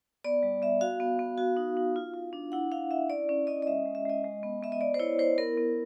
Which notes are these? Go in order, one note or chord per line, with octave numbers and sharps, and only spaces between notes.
B3 D5
G3
B3 E5
F#4 F5
B3
B3
F#4
D#4
D#4
F4
F4
D4
E4 F#5
E4 F5
E4 E5
C#4 D5
C#4
C#4 D#5
D#5
G#3 E5
G#3
E5
G#3 D#5
G#3
B3
B3 E5
D#5
B3 D5
C5
E4 C#5
E4 C5
B3 A#4
B3